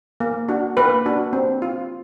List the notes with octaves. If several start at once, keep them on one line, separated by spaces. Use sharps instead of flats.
A#3
D4 F#4
A#3 B4
D4 F#4
C4
F4